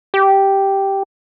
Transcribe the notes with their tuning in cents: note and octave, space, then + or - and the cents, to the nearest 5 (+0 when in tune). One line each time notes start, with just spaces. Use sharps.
G4 -5